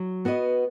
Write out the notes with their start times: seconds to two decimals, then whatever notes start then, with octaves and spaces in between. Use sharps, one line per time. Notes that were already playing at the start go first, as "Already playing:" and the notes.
Already playing: F#3
0.25 B3 F#4 B4 D#5